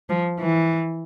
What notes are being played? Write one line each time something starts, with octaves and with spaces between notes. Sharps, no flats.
F3
E3